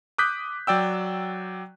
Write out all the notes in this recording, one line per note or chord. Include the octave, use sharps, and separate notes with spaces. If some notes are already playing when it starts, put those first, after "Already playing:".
D6 D#6 F#6 G6 B6
F#3 D5 G5 E6